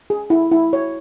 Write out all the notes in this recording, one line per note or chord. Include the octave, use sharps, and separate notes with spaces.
G#4
E4
E4
C#5